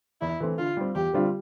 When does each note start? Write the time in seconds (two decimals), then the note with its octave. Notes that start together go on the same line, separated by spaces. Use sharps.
0.21 E2 E4
0.40 E3 A3 C4
0.58 D3 F4
0.77 G3 C4
0.95 E2 G4
1.14 D3 G3 C4 F4